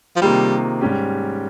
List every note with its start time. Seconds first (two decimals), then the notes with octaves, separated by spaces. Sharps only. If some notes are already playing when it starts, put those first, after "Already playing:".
0.16 F3
0.22 C3 D#3 G3 A#3 F4 G#4
0.81 G#2 G3 C#4 G4